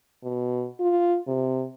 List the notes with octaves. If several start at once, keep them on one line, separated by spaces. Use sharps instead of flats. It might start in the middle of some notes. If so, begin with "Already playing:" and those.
B2
F4
C3